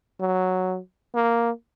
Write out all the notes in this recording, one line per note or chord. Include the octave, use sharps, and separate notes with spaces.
F#3
A#3